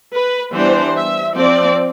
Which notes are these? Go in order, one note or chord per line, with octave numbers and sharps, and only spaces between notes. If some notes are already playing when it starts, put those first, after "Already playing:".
B4
E3 G3 B3 D4 C5
E5
F3 C4 D5